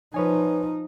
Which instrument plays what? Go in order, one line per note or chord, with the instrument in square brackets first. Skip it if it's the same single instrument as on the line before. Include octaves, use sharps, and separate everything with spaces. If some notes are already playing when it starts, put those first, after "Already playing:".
[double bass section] F3 [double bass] D#4 [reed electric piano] B4 C#5 G#5